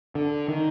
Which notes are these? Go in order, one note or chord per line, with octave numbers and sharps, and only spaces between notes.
D3
D#3